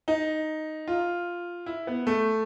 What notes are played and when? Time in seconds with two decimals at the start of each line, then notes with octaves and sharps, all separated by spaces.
0.08 D#4
0.88 F4
1.66 E4
1.87 B3
2.07 A3